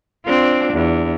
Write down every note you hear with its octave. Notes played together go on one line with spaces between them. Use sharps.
C4 D4 F4
E2